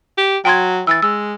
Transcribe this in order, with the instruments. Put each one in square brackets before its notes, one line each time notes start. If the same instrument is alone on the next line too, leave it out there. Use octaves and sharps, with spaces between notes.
[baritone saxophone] G4
[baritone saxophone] F#3 [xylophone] G5 C6 G#6
[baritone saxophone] E3 [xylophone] E6 A6
[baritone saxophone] G#3 [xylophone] E6